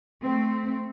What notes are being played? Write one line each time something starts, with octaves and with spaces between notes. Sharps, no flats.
A3 C4